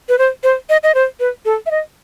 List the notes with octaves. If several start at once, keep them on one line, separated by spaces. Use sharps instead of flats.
B4
C5
C5
D#5
D#5
C5
B4
A4
E5
D#5